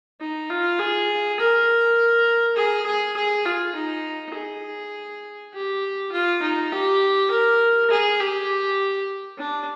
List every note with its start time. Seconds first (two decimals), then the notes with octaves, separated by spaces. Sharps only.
0.20 D#4
0.50 F4
0.79 G#4
1.39 A#4
2.56 G#4
2.86 G#4
3.16 G#4
3.45 F4
3.75 D#4
4.34 G#4
5.54 G4
6.12 F4
6.42 D#4
6.72 G4
7.30 A#4
7.90 G#4
8.20 G4
9.38 D4